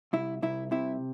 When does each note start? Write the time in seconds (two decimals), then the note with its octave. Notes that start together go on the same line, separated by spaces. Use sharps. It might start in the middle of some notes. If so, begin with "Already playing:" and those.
0.13 C2 E4
0.42 C2 E4
0.71 C3 E4